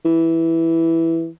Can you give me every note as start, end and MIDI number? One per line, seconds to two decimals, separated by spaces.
0.05 1.28 52